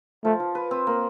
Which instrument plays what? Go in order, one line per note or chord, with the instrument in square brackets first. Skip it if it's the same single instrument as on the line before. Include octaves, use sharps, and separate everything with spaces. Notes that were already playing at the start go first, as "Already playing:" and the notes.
[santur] F3 [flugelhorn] A3
[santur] F3
B4
C4
A#3